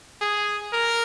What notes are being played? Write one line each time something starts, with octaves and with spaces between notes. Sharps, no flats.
G#4
A#4